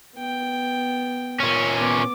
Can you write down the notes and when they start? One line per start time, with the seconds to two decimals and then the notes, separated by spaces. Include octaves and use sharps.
0.16 B3 G5
1.40 A#2 C#4
1.77 B3 D6